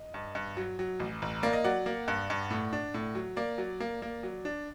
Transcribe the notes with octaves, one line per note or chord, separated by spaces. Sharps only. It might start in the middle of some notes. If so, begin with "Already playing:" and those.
Already playing: D#5
G2
G2
F#3
F#3
A1
A1
A#3 D5
D#5
F#3 D5 F#5
A#3
G2
G2
A2
D4
A2
F#3
A#3 D5
F#3
A#3
A#3
F#3
D4